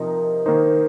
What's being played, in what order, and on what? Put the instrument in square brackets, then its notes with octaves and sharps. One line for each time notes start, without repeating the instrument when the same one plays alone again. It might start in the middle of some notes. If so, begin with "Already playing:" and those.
Already playing: [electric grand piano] C3 F3 D#4 D#5 [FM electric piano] A#4
[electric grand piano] D#3 A#3 D#4 C5